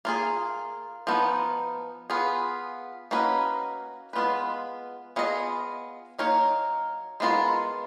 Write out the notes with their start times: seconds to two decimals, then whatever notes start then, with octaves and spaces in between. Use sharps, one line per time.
0.05 A#3 F4 G#4
1.07 F3 B3 D#4
2.10 B3 F4 G#4
3.11 A#3 C#4 F#4 B4 D#5
4.13 G#3 B3 F4 B4
5.16 B3 F4 G#4 B4 D#5
6.19 F#3 A#3 D#4 A#4 C#5
7.20 G#3 B3 F4 A#4